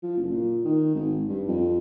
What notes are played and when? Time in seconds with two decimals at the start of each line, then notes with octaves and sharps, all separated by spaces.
0.03 F3
0.17 F#1
0.31 A#2
0.65 D#3
0.95 G#1
1.29 G2
1.48 F2